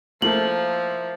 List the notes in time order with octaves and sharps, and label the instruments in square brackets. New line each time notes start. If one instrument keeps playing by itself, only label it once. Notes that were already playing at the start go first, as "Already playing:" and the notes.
[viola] F3 [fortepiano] A3 [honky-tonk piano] A#3 E4 [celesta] F#7